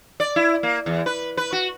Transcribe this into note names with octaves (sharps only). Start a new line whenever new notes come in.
D5
E4
A#3
E2
B4
B4
F#4